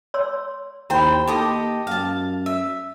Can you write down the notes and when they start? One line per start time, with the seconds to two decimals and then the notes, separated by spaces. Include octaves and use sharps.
0.14 C#5 C6 E6
0.90 D#2 E4 C5 G5 B5
1.27 A#3 D#4 G4 A4 D#5
1.87 F#2 F5 A5
2.46 E5